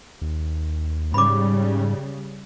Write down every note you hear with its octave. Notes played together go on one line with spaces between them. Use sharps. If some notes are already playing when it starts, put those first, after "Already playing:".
D#2
G#2 C#3 G3 B5 D6